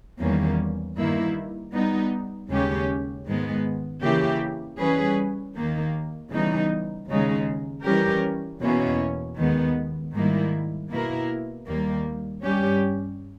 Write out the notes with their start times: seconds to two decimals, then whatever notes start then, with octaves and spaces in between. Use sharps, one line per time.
0.20 E2 D#3 G3 A#3 C#4
0.97 G2 D#3 A#3 E4
1.73 G3 B3 D#4
2.49 D#2 C#3 G#3 C#4 G4
3.25 G#2 D#3 G#3 B3
4.02 C#3 E3 A#3 E4 G4
4.78 E3 G3 C#4 G#4 B4
5.55 D#2 D#3 A#3
6.31 C#3 E3 G3 B3 D#4
7.08 D#2 C#3 G#3 D#4
7.84 E3 G3 C#4 G4 A#4
8.61 E2 B2 A#3 C#4 E4
9.37 D#2 D#3 G#3 B3
10.13 G#2 D#3 G3 A#3 E4
10.90 B2 A#3 E4 A#4
11.67 D#2 D#3 G3 A#3
12.43 G2 G3 C#4 G4